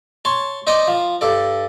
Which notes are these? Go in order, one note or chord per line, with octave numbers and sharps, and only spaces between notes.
C#5 A5 C6
D#4 C5 D5 D#5
F3
G2 A4 D5